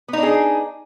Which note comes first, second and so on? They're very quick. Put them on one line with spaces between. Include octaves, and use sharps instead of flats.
B3 D#4 D4 G#4